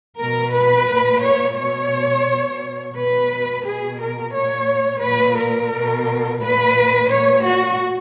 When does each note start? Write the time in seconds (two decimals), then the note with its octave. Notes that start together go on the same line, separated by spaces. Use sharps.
0.19 B2 A#4
0.54 B4
0.88 A#2
1.23 C#5
1.58 B2 C#5
2.27 B2
2.96 B2 B4
3.65 B2 G#4
4.00 A#4
4.33 A#2 C#5
5.03 A#2 B4
5.38 A#4
5.73 B2
6.41 A#2 B4
7.11 A#2 C#5
7.44 F#4